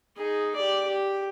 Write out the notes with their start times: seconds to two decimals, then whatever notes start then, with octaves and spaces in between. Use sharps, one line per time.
0.16 D#4 G#4
0.56 G4 D5
0.87 G4